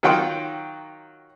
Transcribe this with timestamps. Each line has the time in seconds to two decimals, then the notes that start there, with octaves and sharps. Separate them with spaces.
0.03 D#3 F#3 F4 F#5 G5 C6